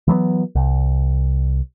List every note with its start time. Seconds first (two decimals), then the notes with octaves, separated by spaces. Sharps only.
0.08 E3 F#3 A3 B3
0.55 C2